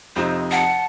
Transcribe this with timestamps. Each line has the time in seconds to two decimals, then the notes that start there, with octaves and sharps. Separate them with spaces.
0.16 F2 C3 D#4 C5
0.51 F#5 A5